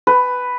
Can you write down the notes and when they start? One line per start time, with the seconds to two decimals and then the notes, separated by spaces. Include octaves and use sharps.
0.07 B4